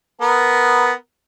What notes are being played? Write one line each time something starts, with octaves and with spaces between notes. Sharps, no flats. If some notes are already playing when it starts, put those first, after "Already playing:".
B3 A#4